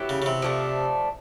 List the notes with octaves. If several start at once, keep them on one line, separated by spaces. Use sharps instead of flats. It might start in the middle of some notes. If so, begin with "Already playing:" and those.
Already playing: F#3 B3 E4 G4
C#3
C#3
C3
F3 A3 D4